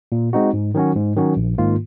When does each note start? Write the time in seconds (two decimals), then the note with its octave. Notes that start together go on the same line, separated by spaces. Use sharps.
0.12 A#2
0.33 G#3 C4 D#4 F#4
0.53 G#2
0.74 D#3 F#3 C#4 F#4
0.95 G#2
1.16 D#3 F#3 C#4 F#4
1.37 A#1
1.58 G#2 D#3 A#3 F4